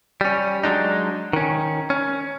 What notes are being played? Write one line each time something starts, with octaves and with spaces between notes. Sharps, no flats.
G3 C#4
F#3 G#3 D4 D#4
D#3 C#4
C#4